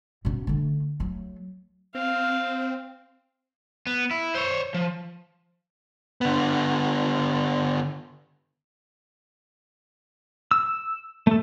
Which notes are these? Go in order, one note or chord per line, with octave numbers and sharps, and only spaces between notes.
B2 C#4
D3 A3
F#3 A3
C4 F5
B3
E4
C5 C#5
F3
D3 B3
E6
A3 A4